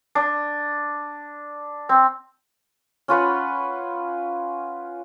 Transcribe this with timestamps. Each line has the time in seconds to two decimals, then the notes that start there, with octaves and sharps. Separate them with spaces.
0.15 D4
1.89 C4
3.08 C#4 F4 B4 F#5